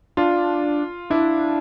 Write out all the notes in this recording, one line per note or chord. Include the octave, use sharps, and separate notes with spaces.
D4 F4
D4 E4